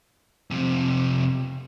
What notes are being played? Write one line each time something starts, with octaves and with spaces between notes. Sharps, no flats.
F2 C3